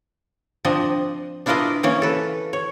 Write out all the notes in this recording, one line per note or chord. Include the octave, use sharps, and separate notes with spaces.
F3 C4 D4 D#5
D4 E4 F4 A#4 B4 D#5
E3 A#3 C#4
A4 B4
C#5